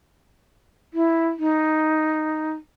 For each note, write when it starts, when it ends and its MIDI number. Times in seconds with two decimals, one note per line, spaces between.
0.94 1.29 64
1.39 2.52 63